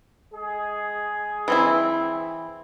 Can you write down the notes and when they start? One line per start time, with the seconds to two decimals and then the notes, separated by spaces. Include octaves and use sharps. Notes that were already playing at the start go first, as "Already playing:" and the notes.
0.33 G#3 G#4
1.48 E3 C4 E4